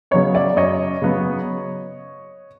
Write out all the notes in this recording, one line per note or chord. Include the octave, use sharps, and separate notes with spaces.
C#3 F#3 B3 C#5 D#5
D5 E5
F#2 C#5 D#5
C#3 F#3 B3